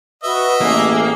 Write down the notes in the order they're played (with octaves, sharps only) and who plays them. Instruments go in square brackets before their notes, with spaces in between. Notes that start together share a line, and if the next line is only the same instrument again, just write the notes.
[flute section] F#4 B4 [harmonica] D#5 E5
[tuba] A1 [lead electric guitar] A#3 [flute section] G#4